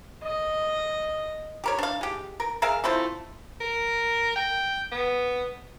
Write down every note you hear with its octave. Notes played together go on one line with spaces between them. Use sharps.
D#5
G4 A#4 C#5
D4 F5
G#3 G4
A#4
G#4 A#4 E5 F5
A3 C4 E4 F4
A#4
G5
B3